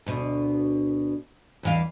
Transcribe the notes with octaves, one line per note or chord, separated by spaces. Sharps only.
D2 B2
E2 E3 F5